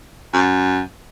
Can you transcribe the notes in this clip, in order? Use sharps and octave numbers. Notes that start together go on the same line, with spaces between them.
F#2